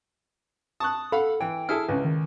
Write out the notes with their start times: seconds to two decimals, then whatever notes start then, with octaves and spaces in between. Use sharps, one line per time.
0.80 A5 C#6 D#6 F#6
1.12 A4 F5 F#5 B5
1.40 E3 G5
1.69 E4 G#4 A4 F6
1.89 C#2 C#3 B4
2.05 D#3